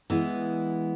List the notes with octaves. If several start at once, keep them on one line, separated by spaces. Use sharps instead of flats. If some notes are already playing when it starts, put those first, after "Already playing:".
E3 G#3 B3 E4